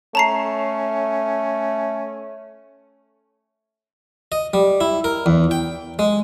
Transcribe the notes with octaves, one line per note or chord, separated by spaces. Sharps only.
A3 C#4 A5 A#5 C7
D#5
G3
E4
A#4
E2
G5
G#3